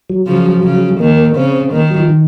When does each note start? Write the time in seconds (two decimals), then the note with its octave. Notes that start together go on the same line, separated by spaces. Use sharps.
0.10 F#3
0.27 C#3 F3
0.64 C#3
1.00 D#3 A#3
1.36 C#3 C4
1.73 D#3 A#3
1.90 F#3
2.00 F3
2.09 D#3